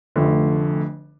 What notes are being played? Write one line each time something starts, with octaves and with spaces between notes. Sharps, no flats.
F1 F2 D3 A3